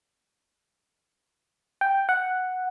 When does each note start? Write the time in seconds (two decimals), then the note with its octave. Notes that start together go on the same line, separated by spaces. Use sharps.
1.81 G5
2.09 F#5